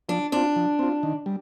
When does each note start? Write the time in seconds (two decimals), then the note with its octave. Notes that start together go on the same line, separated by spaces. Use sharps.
0.09 F3 D4
0.32 C4 D4 F4
0.56 F3
0.79 C4 F4
1.03 D#3
1.26 G3